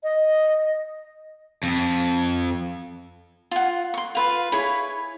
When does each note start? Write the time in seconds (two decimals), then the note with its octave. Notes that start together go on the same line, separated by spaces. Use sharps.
0.03 D#5
1.63 F2
3.51 F4 F#5
3.94 C6 C#6
4.15 F4 B4 F5
4.52 E4 G#4 C#5 B5